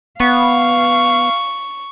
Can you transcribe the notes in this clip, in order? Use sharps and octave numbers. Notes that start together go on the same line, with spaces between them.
B3 F5 C#6